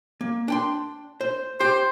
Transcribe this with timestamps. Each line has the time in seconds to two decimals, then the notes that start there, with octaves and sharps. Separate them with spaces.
0.21 A#3
0.48 D4 G5 C6
1.21 C5
1.60 G4 C5